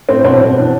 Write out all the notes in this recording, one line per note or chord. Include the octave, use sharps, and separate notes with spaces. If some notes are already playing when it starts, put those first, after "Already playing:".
A2 C4
B2 C4
B2 C4
E3 D4